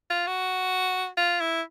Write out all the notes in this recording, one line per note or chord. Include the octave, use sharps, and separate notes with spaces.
F4
F#4
F4
E4